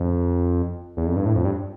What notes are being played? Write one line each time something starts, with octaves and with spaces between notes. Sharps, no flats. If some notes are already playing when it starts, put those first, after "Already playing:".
Already playing: F2
E2
F2
G2
A2
F2
G2